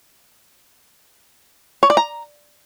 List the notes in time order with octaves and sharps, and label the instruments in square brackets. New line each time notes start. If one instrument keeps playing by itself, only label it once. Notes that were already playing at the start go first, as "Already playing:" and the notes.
[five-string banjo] C#5
D5
A#5